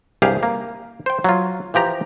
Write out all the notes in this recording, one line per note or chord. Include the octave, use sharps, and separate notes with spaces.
C2 G2 G4 G#4 F5
A#3
C5 G5
F#3 F4
E3 F3 G4 A#5